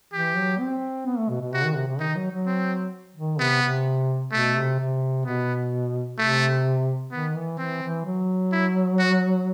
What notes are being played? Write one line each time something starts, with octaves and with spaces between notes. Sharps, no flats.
E3 G4
F#3
C4
B3
A3
B2
B2
C3 F#4
D#3
C3
C3
D#3 D#4
F#3
F#3
C4
D#3
C3 B3
C3
B2 A3
C3
C3
B2 B3
C3 A3
D#3 B3
E3
E3 C4
E3
F#3
E4
F#4